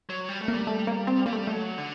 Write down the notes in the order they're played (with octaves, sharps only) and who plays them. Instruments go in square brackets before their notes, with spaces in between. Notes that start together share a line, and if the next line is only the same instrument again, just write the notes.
[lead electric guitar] F#3
G3
A3
[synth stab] A#3
[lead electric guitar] G3
[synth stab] A3
A#3
C4
[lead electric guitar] G3 [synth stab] A#3
[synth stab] A3
[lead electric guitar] F#3 [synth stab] A3
[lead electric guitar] D3